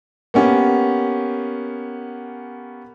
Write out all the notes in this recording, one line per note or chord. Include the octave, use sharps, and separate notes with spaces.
A#3 B3 C#4 G4